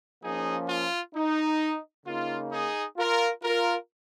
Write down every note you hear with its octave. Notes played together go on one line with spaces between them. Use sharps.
F3 A#3 C#4 D#4 G#4
F4
D#4
C#3 A#3 D#4 F4
D#4 G#4
F4 A#4
F4 A#4